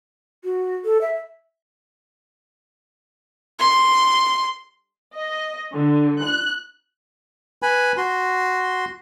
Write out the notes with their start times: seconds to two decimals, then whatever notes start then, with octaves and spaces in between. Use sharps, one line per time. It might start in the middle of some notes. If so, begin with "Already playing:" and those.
0.44 F#4
0.85 A4
1.01 E5
3.59 C6
5.15 D#5
5.73 D3
6.21 F#6
7.62 B4 G#5 B5
7.97 F#4 C6